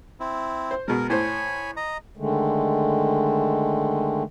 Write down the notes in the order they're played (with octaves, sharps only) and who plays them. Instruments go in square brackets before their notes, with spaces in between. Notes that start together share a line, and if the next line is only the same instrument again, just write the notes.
[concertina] C4 E4
[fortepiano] C5
[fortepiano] B2 G#3 [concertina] A#4
[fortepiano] A2 C5 [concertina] C#5 G#5 B5
[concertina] D#5 A#5
[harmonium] D3 D#3 G#3 A3